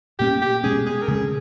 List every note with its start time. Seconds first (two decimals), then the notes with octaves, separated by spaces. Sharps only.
0.19 A#2 A#3 C#4 G4
0.42 G4
0.64 B2 G#3 C#4 G#4
0.86 G#4
1.02 A#4
1.08 C#3 G#3 C#4 G#4